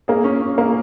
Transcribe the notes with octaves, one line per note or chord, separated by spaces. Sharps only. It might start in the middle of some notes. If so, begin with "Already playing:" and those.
A#3 G#4
C#4
C#4
A#3